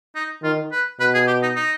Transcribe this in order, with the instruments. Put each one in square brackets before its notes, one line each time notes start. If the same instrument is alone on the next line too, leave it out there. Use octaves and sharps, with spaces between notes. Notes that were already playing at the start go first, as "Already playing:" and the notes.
[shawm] D#4
[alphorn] D#3 [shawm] F4
[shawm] B4
[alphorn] B2 [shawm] B4
[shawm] G#4
G4
D#4
D#4